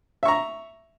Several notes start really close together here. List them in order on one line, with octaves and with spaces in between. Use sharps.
E5 C#6 A#5